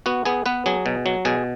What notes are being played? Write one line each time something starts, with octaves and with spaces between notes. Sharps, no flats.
B3 F#4
B3 G#4
B3 B4
F#3 G#4
B2
F#3
B2 G#4